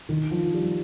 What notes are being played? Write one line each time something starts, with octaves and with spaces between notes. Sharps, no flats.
D#3
F3
G3